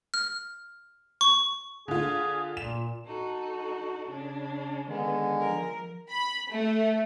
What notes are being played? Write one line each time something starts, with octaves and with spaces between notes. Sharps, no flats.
F6
C#6
D3 F4 G#4
A#2 E7
D#4 F#4 A4
C#3 D4
D3 D#3 G#3 B3
F3 A#4
B5
A3